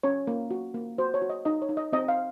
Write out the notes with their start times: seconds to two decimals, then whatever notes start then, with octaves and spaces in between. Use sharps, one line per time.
0.03 C#4 C#5
0.27 A#3
0.51 F#4
0.74 A#3
0.98 F#4 C5
1.14 C#5
1.22 F#4
1.30 D#5
1.45 D#4 D#5
1.62 C#5
1.69 D#4
1.77 D#5
1.93 C4 D#5
2.08 F5